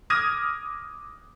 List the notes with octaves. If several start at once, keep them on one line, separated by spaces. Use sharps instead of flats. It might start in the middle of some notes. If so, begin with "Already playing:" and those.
D6 D#6 F6 G#6 A#6 D#7